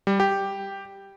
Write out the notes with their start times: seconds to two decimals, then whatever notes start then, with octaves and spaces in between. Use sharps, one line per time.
0.07 G3
0.20 G4